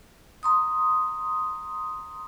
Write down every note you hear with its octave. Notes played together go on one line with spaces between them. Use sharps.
A#5 C6 D#6